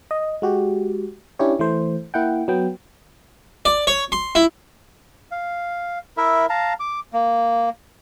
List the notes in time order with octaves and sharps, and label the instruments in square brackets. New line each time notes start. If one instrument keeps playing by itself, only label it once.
[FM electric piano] D#5
G#3 F#4 G4
C#4 D4 E4 G4 C#5
E3 A3 C5
A#3 E4 F#5 G5
F#3 B3 G5
[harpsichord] D5
C#5
C6
E4
[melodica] F5
E4 A#4 E5
F5 A5 A#5
D6
A#3